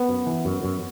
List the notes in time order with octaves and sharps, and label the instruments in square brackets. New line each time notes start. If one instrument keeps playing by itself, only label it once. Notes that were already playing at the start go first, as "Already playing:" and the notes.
Already playing: [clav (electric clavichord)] B3
F#2
E3
F#2
F#2